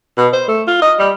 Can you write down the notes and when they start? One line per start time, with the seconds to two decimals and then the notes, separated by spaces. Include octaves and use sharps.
0.17 B2
0.33 C5
0.48 A3
0.68 F4
0.82 D#5
0.99 G3